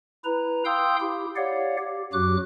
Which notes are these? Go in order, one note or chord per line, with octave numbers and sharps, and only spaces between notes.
E4 B4 A#5
F5 G5 C6 D#6 E6 G6
E4 G4
G4 C#5 D5 F5 F#5
G4
F#2 F#3 F#4 G4 D6 F#6